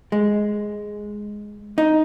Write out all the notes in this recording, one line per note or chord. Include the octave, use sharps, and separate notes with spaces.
G#3
D#4